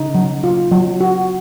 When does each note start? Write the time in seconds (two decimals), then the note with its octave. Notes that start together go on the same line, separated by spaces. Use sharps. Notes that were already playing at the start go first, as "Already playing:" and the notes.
Already playing: C#3 D#4
0.15 F#3
0.44 F4
0.71 F#3
1.01 F#4